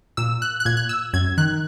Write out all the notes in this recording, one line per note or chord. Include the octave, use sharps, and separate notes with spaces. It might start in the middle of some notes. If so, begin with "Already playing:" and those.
A#2 E6
F#6
F#6
A#2 G#6
F#6
E6
F#2 G#6
D#3 F#6